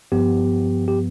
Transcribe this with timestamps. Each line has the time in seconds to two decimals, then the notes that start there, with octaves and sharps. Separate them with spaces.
0.12 G2 F3 B3 G4
0.88 G4